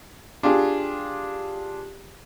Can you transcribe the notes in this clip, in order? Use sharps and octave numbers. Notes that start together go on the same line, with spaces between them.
D4 F4 G4 G#4